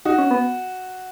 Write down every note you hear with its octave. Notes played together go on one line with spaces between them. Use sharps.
D#4 F#4
C#4
B3